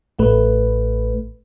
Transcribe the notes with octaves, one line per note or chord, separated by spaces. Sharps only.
A1 A3 B4